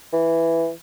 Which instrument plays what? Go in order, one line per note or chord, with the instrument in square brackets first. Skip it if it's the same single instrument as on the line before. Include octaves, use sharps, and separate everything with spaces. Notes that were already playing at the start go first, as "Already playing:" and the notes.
[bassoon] E3